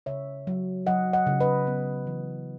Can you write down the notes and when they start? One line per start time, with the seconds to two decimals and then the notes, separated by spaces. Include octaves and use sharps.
0.06 C#3 C#5 E5
0.47 F#3
0.86 F#3 D#5 F#5
1.13 D#5 F#5
1.27 C#3
1.40 B4 D#5
1.67 B3
2.07 E3